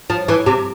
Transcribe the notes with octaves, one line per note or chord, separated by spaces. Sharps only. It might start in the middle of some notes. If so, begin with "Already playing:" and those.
F3
E3
C3